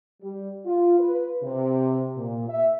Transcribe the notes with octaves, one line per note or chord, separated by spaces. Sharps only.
G3
F4
B4
C3
A#2
E5